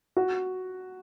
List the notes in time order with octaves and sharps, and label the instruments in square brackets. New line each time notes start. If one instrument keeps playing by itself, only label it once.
[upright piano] F#4